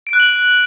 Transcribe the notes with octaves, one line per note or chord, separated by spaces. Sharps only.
D7
F#6
F#7